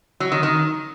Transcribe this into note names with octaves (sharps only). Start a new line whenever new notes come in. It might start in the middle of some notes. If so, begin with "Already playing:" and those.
F#3
D#3
D#3